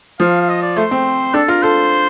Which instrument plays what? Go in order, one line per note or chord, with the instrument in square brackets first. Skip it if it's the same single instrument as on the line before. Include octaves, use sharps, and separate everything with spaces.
[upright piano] F3 [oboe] F5
[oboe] F5
D#5
D5
[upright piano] A3 [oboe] C5
[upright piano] C4
[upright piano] D4 [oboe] A4
[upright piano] F4 [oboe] A#4
[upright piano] A4 [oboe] C5